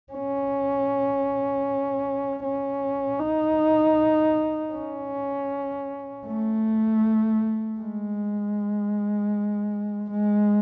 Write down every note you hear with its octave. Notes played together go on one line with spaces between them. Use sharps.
C#4
C#4
D#4
C#4
A3
G#3
G#3